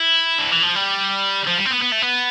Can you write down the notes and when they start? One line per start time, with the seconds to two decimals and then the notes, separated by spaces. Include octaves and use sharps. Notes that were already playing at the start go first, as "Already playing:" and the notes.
Already playing: E4
0.39 D3
0.52 E3
0.63 F3
0.76 G3
1.47 F3
1.58 G3
1.66 C4
1.71 B3
1.82 B3
1.92 A3
2.02 B3